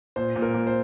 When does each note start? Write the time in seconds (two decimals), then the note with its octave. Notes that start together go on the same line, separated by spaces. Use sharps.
0.16 A#2 C5
0.36 A#2
0.42 A#4
0.54 A#2
0.67 C5